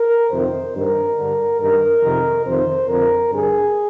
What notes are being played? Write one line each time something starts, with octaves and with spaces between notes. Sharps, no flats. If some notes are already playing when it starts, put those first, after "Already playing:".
Already playing: A#4
F2 C3 D#3 C5
G2 D#3 A#4
G2 D3
G2 D#3 A#4
F2 C3 D#3
F2 C3 D#3 C5
F2 D3 A#4
G2 D3 G#4